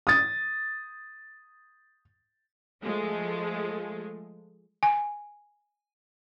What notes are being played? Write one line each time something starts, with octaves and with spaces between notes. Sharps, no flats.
D#6 A6
F3 G#3 A3
G#5